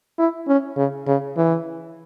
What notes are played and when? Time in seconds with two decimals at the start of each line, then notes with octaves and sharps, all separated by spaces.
0.18 E4
0.48 C#4
0.77 C#3
1.07 C#3
1.37 E3